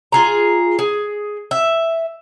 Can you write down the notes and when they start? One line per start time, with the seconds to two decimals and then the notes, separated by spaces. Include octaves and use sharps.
0.12 F4 G#4 A#5
0.79 G#4
1.51 E5